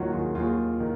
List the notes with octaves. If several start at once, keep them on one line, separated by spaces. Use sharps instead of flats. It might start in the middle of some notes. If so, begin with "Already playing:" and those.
Already playing: D#2 D#3 F#3 F4 F#4
F4 G#4
D#2 F4 G#4
D#3